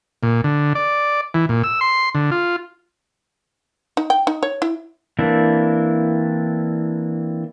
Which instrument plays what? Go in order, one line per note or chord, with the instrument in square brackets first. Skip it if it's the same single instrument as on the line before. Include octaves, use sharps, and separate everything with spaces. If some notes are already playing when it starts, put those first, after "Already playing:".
[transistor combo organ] A#2
D3
D5
E3
A#2
E6
C6
D3
F4
[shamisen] D#4
G5
D#4
C#5
E4
[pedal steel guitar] E3 A#3 C4 D4 E4